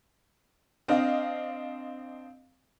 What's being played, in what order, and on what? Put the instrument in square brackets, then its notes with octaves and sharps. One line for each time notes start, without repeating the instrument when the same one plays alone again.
[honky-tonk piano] C4 D4 D#5 F5